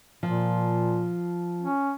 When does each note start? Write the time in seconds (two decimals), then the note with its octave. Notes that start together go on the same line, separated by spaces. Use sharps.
0.23 A#2 F3
1.61 C#4